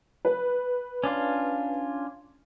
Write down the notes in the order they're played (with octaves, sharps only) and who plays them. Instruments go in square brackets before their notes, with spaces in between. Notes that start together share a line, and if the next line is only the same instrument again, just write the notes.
[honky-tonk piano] B4
[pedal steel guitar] C#4 D4 F4